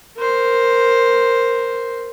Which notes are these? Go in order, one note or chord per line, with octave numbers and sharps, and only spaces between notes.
A#4 C5